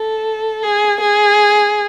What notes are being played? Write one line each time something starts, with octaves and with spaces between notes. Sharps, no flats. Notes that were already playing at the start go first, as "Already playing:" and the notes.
Already playing: A4
G#4
G#4